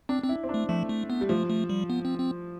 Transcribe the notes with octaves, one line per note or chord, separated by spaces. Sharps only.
C4 D4
C4
E4
C4
D4
A3
F3 A3
A3
B3
G3
F3 A3
A3
G3
B3
C4
C4